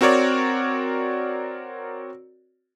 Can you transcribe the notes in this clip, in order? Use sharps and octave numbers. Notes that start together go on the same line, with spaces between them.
C4 F#4 A#4 C#5 D5